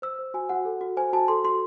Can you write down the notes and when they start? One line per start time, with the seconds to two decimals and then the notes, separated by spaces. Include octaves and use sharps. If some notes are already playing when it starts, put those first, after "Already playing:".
0.02 C5 E6
0.19 C5
0.34 F#4 G#5
0.49 F#4 F#5
0.65 A4
0.81 F#4
0.97 C5 G#5
1.13 F#4 A5
1.28 A4 C6
1.44 F#4 C6